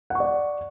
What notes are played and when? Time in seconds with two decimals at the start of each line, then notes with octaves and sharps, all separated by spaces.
0.10 F#5
0.15 C#6
0.20 D5